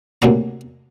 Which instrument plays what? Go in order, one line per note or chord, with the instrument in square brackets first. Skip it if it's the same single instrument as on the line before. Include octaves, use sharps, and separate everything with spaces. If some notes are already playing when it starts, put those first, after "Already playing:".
[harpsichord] D2 C3 F#3 A#3 A#5